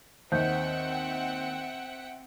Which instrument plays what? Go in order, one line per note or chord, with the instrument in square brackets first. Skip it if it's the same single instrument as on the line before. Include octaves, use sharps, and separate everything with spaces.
[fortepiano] D#2 [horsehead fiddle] C4 [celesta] C5 G6 [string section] E5 F#5 G5